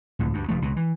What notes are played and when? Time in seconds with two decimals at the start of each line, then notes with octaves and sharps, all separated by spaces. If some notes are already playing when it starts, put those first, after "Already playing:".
0.19 C#2 A2 D3
0.33 D2 G2
0.49 F1 F3 A3
0.62 C#2 B2
0.76 E3